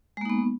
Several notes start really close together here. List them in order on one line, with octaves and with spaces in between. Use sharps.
G#3 A#3 D#4 B3